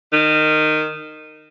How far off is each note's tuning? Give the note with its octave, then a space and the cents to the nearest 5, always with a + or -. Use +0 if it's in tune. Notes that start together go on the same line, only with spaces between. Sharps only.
D#3 -15